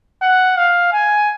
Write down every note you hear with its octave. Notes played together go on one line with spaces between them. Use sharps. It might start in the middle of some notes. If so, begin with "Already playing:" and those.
F#5
F5
G#5